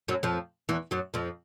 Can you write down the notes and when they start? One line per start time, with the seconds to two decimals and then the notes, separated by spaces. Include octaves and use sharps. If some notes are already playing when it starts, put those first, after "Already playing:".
0.08 F#2 F#3
0.23 F2 F3
0.69 E2 E3
0.91 F#2 F#3
1.14 F2 F3